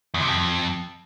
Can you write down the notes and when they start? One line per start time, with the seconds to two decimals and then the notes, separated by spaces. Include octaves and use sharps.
0.14 E2
0.21 C3
0.27 F2